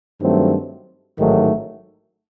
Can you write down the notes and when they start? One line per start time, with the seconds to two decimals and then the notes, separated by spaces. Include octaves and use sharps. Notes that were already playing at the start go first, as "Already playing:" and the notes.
0.21 G2 D#3 F#3 A3 C4
1.18 A1 G#2 D#3 F#3 A3